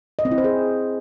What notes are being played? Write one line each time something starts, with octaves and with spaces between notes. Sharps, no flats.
D#5
C4
E4
C5
G#4